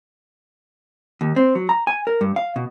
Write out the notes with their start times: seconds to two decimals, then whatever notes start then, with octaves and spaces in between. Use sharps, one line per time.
1.21 D#2
1.36 C4
1.55 F#3
1.69 A#5
1.87 G#5
2.07 A#4
2.21 G2
2.36 F5
2.56 B2